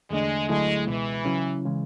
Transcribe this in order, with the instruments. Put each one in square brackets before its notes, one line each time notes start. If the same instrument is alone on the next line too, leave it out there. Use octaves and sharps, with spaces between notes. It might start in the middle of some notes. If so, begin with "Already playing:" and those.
[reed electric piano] E2 D3 A3 D4 [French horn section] G#3
[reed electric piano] D2 D3 F#3 A3 E4 [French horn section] G#3
[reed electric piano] C#2 B2 G#3 [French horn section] E3
[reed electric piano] C#3 F#3 C#4 E4
C#3 E3 G#3